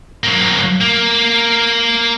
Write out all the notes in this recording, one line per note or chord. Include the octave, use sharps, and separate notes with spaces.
F#3 A#3
A#3